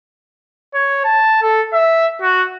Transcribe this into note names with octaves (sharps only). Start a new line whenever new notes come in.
C#5
A5
A4
E5
F#4